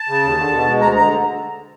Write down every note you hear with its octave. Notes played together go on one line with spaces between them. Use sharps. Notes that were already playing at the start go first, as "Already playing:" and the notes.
Already playing: A5
C#3
D#2
D3
B2
G#3
D2 A#5
D3 A#5